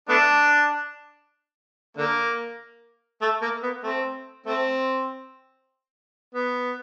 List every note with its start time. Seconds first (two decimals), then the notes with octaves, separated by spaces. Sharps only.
0.09 A3 B3 D4
1.97 D3 A#3
3.22 A3
3.42 A#3
3.63 B3
3.83 A3 C4
4.46 A3 C4
6.34 B3